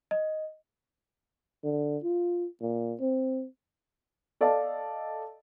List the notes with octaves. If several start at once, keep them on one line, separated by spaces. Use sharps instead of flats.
D#5
D3
F4
A#2
C4
A4 D5 D#5 F5 A5